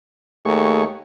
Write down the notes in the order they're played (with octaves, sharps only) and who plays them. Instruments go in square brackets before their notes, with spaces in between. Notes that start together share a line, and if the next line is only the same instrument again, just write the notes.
[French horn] D#2 [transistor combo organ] A3 G#4 C#6